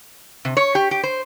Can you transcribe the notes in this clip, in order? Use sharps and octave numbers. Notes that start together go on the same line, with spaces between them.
C3
C#5
G4
G4
C5